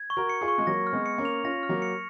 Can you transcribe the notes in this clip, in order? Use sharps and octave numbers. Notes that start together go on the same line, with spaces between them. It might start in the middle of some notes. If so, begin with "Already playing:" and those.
Already playing: G#6
C#6
F#4 A#4
C#7
F4 G#4
C#6
G#3
F#3 A#3 A#6
F6
G#3 B3
C#7
A#3 C#4
F7
C#4 F4 A#6
F6
F#3 A#3
C#7